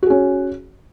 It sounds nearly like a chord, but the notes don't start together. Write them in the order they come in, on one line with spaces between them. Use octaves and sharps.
F#4 G#4 C#4